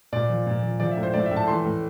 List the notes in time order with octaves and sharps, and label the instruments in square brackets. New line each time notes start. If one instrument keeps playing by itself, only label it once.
[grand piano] A#2 D5
F3
A#2
F3
F3 D5
E5
A2
C5
A2 D5
E5
A2
A5
E3 C6
A2